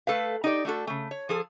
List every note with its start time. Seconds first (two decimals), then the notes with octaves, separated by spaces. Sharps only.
0.07 A3 A4 B4 F5
0.44 D#4 G4 D5
0.65 A3 D4 F#4 A4
0.87 C#3 A3
1.11 C#5
1.29 F3 G#4 A4